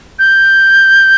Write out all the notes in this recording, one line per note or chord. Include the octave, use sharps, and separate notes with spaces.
G6